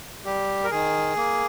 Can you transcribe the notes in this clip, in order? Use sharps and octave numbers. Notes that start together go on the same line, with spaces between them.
G3 G4
A#4
D#3 G#4
A#3